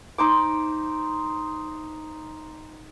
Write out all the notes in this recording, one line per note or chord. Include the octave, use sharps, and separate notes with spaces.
D#4 C5 D6